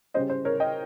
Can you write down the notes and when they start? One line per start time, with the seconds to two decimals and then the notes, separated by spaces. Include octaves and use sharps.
0.14 C#3 G3 C#4 C5 D#5
0.30 C5
0.45 A#4 C#5
0.60 D#5 G5